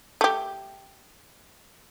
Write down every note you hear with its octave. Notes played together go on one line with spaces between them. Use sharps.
A3 G4